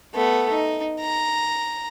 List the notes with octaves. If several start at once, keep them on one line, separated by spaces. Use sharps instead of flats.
A3 B3
D#4
A#5